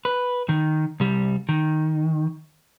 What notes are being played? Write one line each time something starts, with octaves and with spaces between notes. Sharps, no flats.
B4
D#3
C2 G3
D#3